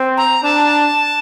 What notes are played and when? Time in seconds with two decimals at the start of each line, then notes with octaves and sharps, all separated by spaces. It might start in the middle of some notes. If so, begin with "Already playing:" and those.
Already playing: C4
0.17 A#5
0.43 D4 A5